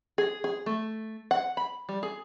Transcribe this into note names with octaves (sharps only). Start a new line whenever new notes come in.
G#4
G#4
A3
F#5
B5
G3
G#4